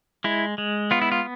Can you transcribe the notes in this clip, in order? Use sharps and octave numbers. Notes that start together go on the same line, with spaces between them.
G#3 E4
G#3
B3 F4
E4
F4